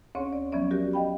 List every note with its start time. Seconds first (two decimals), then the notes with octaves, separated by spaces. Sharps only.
0.15 D2 C4 C#4 G#4 C#5 C6
0.33 D5
0.52 F3 F#3 B3 C#4 D5 E5
0.71 F#4 G4 A#4 D5
0.93 D#5 F5 G5 B5